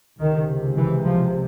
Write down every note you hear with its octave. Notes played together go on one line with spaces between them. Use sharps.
C#2 C3 D#3
E3
F3